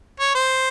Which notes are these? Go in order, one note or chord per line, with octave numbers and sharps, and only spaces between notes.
C#5
C5